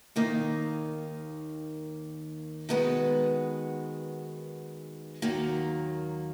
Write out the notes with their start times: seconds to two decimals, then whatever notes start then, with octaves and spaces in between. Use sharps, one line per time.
0.16 D#2 D#3 A#3 D#4
2.69 D#3 G#3 B3 F#4 B4
5.22 D#2 D#3 F#3 A#3